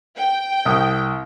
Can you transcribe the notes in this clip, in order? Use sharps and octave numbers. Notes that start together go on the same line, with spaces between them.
G5
C2 D#6